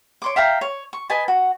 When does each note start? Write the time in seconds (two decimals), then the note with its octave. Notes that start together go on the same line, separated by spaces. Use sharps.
0.22 C#5 C6 D6
0.36 E5 F5 G5 A#5
0.61 C#5
0.93 C#6
1.10 B4 D#5 G#5 A5
1.28 F#4